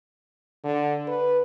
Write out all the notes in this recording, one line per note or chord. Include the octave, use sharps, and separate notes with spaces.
D3
B4